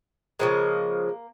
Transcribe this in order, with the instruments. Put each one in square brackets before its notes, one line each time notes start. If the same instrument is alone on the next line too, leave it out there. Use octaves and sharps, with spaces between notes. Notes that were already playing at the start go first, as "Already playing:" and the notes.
[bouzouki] C#3 F3 G#3 A#3